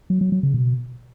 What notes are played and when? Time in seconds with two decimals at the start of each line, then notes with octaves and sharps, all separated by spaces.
0.10 F#3
0.21 F#3
0.32 F#3
0.43 C#3
0.54 B2